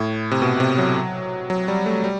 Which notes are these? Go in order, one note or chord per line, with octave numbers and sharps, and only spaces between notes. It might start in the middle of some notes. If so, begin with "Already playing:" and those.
Already playing: A2
C3
B2
C3
F#3
F#3
G3
A3
G3